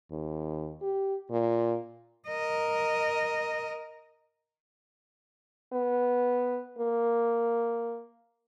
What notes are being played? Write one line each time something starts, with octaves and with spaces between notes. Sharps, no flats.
D#2
G4
A#2
A#4 D#5
B3
A#3